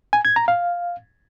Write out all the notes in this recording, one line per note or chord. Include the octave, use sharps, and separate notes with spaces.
G#5
G#6
A#5
F5